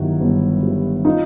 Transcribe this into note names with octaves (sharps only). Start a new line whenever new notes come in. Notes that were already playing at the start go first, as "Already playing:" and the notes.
Already playing: G1 G2 D#3 F#3 E4 F#4
G1
G2 D#3 F#3
D#4 F4